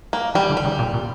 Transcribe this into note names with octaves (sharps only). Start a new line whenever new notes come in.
A#3
E3 G3
D3
G3
C#3
A#2
A#2